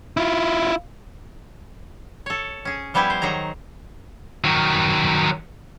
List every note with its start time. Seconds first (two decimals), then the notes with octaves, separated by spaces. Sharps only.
0.17 E4 F4
2.26 A4 C#5
2.65 C#4 G#4
2.94 F3 G3 B3 E4 G4 G#5
3.10 C5
3.22 D#3 F#3 G#4 A#5
4.44 D#3 F#3